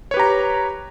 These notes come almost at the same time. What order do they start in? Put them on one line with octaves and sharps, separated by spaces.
C#5 B4 G4 A#5